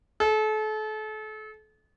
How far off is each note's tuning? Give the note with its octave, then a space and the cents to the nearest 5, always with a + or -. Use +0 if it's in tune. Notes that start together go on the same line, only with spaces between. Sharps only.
A4 -35